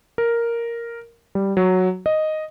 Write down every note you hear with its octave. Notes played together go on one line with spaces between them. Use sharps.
A#4
G3
F#3
D#5